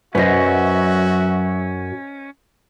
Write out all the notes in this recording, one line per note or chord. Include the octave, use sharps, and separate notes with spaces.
F#2 F#3 C#4 F#4 B4 C5 D#5 E5